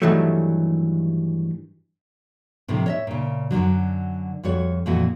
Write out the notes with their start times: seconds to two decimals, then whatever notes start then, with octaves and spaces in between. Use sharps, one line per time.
0.02 G2 D#3 E3 F#3 G3 A3
2.68 A2 C3 D#3 F3 G3
2.86 C#5 D#5 E5
3.07 A#2 C#3
3.51 F#2 B2 D3 F#3
4.43 F2 G3 F#4 C#5
4.86 F2 A#2 E3 E4 F#4